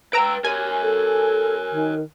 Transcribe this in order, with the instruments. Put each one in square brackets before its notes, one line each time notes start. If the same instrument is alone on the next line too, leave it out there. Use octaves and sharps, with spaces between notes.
[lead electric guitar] B4 G5 [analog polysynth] A#5 E6 D7
[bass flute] G4 [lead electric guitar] A#4 C#5 [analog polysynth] G#5
[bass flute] A4
D#3